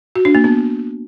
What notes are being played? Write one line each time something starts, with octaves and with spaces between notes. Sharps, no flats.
F#4
D4
A#3
B3